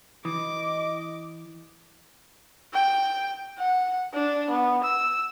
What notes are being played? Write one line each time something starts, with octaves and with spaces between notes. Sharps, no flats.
E3 D#5 D6
G5
F#5
D4
B3
E6